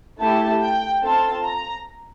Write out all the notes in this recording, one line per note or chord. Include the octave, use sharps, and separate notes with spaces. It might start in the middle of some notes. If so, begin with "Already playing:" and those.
A3 E4 G4 A5
G5
C4 F4 A4 A5
A#5